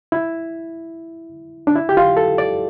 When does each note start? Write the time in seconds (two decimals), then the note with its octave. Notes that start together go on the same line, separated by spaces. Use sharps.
0.12 E4
1.67 D4
1.75 E4
1.89 G4
1.97 F4
2.17 A4
2.38 D5